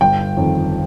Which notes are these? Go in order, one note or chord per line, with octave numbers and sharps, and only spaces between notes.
G1 G5
F2 D#3